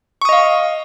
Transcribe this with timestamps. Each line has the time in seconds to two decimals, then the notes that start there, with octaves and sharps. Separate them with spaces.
0.22 C#6
0.25 D#6
0.29 D#5
0.33 F5